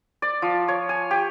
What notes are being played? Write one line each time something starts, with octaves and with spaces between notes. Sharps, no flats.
D5
F3
C#5
G#5
G4